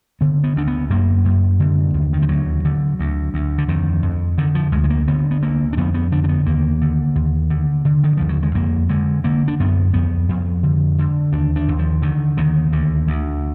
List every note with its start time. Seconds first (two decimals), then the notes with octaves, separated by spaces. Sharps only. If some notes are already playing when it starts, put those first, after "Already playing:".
0.21 D3 B3
0.44 B3
0.56 D2 D4
0.67 B3
0.90 F#2 A#3
1.24 F#2
1.60 D3
1.94 D#2
2.13 D#3
2.22 F3
2.29 D2 F#3
2.65 D3
2.99 D2
3.34 D2
3.58 D3
3.68 F2 D#3
4.03 F2
4.38 D3 D#3
4.55 F3
4.72 D2 G#3
4.84 G#3
4.90 A#3
5.08 D3 B3
5.31 B3
5.42 D2 A#3
5.73 D4
5.77 F2 B3
5.94 B3
6.12 D3 D4
6.24 D4
6.29 B3
6.46 D#2 A#3
6.81 D3
7.15 D#2
7.50 D3
7.85 D3
8.04 D#3
8.17 D#2 F3
8.29 F#3
8.43 G#3
8.55 F2 A#3
8.89 D3 G#3
9.24 D3 A#3
9.48 D4
9.60 F#2 B3
9.93 F2 B3
10.29 F2
10.63 D3
10.98 D3
11.33 D#2 D4
11.56 D4
11.68 D#2
11.79 F3
12.02 D3 D#3
12.37 D#2 D#3
12.72 D2 D3
13.07 D2